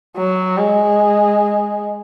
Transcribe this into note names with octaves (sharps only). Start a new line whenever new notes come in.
F#3
G#3